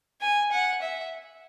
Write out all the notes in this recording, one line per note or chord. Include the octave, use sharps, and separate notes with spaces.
G#5
F#5
E5